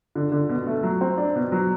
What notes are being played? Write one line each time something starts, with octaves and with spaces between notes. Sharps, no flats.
D3
D3
B2
A3
F#3
C4
D4
B2
F#3